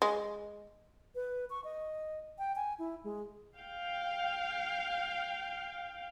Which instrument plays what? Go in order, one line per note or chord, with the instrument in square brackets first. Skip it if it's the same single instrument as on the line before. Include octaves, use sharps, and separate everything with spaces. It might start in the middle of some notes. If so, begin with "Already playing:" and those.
[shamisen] G#3
[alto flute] B4
C#6
D#5
G5
G#5
E4
G#3
[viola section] F5 G5